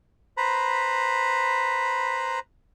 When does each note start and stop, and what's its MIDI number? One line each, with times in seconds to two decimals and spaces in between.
0.37 2.39 71
0.37 2.39 72
0.37 2.39 82
0.37 2.39 83